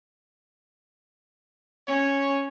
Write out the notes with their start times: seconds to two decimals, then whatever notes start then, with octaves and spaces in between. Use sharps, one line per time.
1.88 C#4 C#5